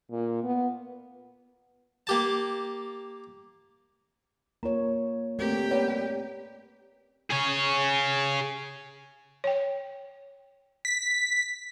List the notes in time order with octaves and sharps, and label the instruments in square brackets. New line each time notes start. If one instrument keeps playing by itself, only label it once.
[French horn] A#2
B3
[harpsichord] A#3 G4 A5
[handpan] A#3 F4 C#5 [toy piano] A#5
[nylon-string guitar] D2 A#3 [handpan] A3 C4 [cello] G4
[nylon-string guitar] G3 A#3 B4 [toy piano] C#4 C#5 D5
[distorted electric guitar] G#4 C#5
[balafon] C#5 G5
[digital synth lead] B6